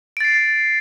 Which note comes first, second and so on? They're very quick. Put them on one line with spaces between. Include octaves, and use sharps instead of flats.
D7 A6 C7